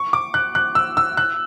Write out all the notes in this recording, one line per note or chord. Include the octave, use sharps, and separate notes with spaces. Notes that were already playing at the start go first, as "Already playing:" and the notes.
Already playing: C#6
D6
F#6
F#6
E6
E6
F#6